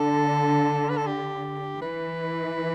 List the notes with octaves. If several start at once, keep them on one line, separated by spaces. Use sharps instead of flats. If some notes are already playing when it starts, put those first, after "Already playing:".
Already playing: D3 A4
B4
A4
G4
E3 B4